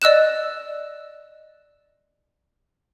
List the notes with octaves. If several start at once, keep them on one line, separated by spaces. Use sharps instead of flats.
D5 D#5 E6 F#6 E7